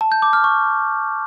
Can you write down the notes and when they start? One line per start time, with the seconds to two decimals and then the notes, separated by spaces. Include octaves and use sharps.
0.01 A5
0.12 G6
0.22 D6
0.33 F6
0.44 C#6